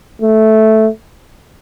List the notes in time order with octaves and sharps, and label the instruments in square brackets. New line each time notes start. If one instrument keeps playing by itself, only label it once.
[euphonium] A3